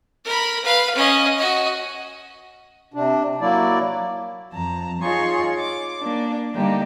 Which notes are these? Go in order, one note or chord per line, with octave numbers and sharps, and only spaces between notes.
A#4 B5
B4 F5
C#4 D#5
F#4 D#5
C3 D4
F#3 A#3 E4 D5
F2 A5 A#5
D#4 F4 G#4 C#5 C6 C#6
D6
A#3 D4
D3 G3 A#3 D4 D#4 G4